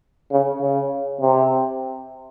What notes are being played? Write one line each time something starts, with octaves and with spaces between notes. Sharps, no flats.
C#3
C#3
C3